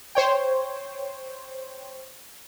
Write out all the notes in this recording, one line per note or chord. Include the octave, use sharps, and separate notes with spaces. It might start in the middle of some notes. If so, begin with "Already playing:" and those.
C5 C#5 G5